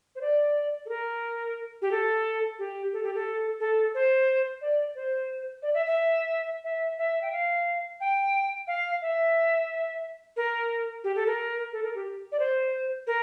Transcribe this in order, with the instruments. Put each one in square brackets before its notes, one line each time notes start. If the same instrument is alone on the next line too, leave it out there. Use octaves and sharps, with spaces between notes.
[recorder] C5
D5
A4
A#4
G4
A4
G4
A4
G4
A4
A4
C5
D5
C5
D5
E5
E5
E5
E5
G5
F5
G5
F5
E5
A#4
G4
A4
A#4
A4
A#4
G4
D5
C5
A#4